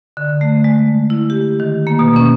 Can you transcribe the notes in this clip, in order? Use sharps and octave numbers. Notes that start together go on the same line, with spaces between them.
D3
A3
G#3
E4
G4
D#3
A#3
B2
C#4